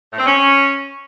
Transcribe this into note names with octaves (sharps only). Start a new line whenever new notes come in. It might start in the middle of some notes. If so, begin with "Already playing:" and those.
A2
C4
C#4